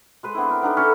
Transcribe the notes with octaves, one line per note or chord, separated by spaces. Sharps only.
G#3 B4 C5
B3 C4 D4 E4
A#4
B3 D4 D#4 A4
C#4 E4 A4